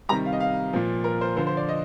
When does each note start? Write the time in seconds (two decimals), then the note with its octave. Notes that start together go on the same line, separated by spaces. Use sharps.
0.09 C3 D#3 G3 A#5
0.26 F5
0.33 D#5
0.40 F5
0.73 A#2 F3
1.04 A#4
1.21 C5
1.37 D3 F3 C5
1.47 C5
1.57 D5
1.69 D#5